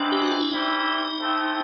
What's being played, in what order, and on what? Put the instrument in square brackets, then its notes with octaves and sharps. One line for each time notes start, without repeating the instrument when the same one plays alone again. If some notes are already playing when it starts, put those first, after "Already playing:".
Already playing: [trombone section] E2 C3 E3 G#3 C4 [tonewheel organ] D4
[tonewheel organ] G4
F#4
F4
E4
[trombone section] C3 E3 G3 C4 E4 [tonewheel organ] D#4
[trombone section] A2 F3 A3 C4